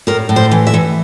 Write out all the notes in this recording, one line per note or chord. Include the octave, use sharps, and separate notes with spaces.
A2 A#4
A2
C5
E3
E5
E3